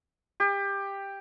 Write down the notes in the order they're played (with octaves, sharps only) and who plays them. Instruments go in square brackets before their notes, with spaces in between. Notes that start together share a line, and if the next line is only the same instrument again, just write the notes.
[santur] G4